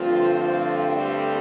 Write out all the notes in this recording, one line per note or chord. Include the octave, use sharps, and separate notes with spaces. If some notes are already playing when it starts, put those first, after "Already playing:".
Already playing: G2 D3 F3 A3 C4 F4
F3 F4
G3 G4